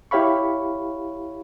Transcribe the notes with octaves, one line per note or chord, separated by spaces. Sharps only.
E4 G4 C#5 F5 B5 C#6